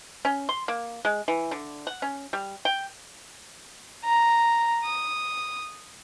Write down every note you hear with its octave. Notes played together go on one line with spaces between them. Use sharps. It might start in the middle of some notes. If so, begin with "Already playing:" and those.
C#4
C6
A#3
G#3
E3
D3
F#5
C#4
G3
G5
A#5
D#6